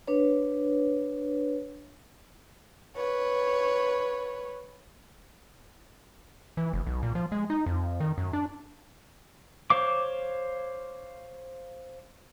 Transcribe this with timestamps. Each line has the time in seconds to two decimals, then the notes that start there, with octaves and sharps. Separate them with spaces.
0.08 D4 B4 C#5
2.96 B4 C#5
6.57 E3
6.73 F1
6.87 B1
7.03 A#2
7.15 F3
7.32 G#3
7.50 D#4
7.66 F2
8.00 D#3
8.18 F#2
8.33 D4
9.70 C5 C#5 F5 D6